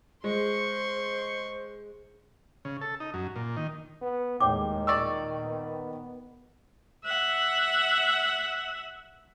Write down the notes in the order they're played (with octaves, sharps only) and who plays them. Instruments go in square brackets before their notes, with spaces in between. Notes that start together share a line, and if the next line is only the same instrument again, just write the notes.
[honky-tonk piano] G#3 [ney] C5 [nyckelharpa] C6 C#6
[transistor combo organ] C#3
A4
D#4
F#2
A#2
D#3
[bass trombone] B3
[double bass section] D#2 A2 G#3 [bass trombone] D#3 [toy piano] C#5 G5 D6
[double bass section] A#2 [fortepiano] D5 C#6 E6
[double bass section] B3
[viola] E5 F#5